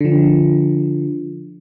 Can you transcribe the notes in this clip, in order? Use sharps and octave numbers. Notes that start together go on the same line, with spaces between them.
D3 F3